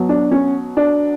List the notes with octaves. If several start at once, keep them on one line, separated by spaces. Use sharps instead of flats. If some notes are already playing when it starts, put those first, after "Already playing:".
Already playing: B2 F#3
D4
C#4
D4